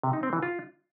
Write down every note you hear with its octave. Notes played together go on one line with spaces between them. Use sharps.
C3
D#4
C4
E3
F4